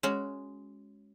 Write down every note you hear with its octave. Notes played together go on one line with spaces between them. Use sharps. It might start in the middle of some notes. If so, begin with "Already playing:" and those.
G#3 C#4 F#4